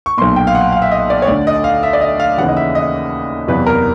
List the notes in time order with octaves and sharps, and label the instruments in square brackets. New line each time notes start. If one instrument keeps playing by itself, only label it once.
[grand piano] C#6
B1 A#2 C6
G5
F5
F#5
F5
E5
D#5
D5
C#5
D2 D3 D5
D#5
F5
E5
D5
D#5
F5
D#2 C#3 E3 F#5
D#5
E5
D#5
F#1 E2 C3 E3 B4
A#4